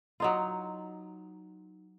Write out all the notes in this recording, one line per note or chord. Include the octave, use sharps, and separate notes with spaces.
F#3 D#4 F4